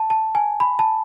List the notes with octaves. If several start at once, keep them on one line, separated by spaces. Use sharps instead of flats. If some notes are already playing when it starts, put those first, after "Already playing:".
Already playing: A5
A5
G#5
B5
A5